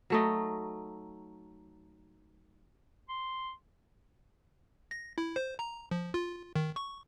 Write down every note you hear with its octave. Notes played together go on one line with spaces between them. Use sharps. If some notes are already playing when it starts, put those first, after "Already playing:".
F#3 A3 D#4
C6
A#6
E4
C5
A#5
F3
F4
D#3
C#6